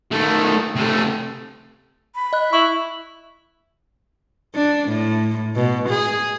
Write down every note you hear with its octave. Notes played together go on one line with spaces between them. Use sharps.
D#3 A3
C3 A3
B5
D#5 F#6
E4 C#6
D4
A2
B2
G#4